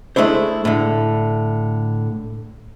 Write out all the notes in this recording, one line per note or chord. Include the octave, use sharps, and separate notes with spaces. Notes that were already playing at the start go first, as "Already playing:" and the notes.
G#3 A3 D4 E4 C5
A2 D3